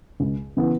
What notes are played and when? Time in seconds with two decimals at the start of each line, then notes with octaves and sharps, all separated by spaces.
0.20 C#2
0.57 C#3 E3 B3